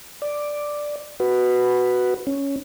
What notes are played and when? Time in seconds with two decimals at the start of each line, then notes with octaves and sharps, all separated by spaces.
0.22 D5
1.20 F#4 B4
2.27 C#4